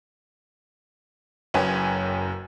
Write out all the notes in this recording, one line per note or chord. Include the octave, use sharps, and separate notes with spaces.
F#1 F#2 B4 C#5 G5 G#5